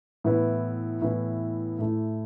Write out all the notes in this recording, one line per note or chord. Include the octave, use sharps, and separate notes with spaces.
A2 E3 B3 E4
A2 E3 B3 E4
A2 A3 E4